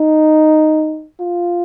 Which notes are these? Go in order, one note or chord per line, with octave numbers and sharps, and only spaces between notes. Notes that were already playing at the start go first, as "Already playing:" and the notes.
Already playing: D#4
F4